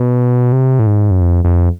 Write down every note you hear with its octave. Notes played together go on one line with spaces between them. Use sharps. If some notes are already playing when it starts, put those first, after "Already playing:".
Already playing: B2
C3
A2
G#2
F#2
F2
F2